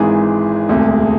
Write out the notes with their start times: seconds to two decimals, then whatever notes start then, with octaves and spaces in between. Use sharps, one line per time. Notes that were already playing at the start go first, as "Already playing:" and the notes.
Already playing: G#1 G#2 E3 G#4
0.68 E1 D2 C3